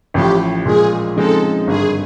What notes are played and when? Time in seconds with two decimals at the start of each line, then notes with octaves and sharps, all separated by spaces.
0.14 A1 A2 F3 G4
0.65 A#2 F3 G#3 G#4
1.16 C#3 F3 G#3 C4 D#4 A4
1.67 G#1 G2 D3 G#4